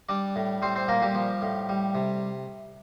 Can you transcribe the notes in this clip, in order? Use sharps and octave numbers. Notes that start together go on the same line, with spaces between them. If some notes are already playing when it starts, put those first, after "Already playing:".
G3 D4 D5
A2
G3 C4 C5
C4 C5
A#2 A#3 A#4
G3 G4
F3
A2
G3
C3